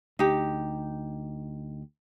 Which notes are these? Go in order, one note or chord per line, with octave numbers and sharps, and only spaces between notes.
D2 D#4 G4